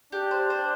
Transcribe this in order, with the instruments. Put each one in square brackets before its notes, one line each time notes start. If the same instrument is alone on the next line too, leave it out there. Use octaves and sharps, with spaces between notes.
[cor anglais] D4 [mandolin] G4
[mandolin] C5
C5